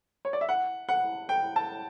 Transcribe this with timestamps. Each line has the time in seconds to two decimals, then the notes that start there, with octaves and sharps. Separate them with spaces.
0.25 C#5
0.33 D5
0.41 E5
0.49 F#5
0.89 F#5
1.29 G5
1.56 A5